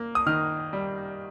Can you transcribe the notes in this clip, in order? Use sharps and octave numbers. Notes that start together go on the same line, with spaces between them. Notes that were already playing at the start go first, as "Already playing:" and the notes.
Already playing: A#3
D#6
D#3 F6
G3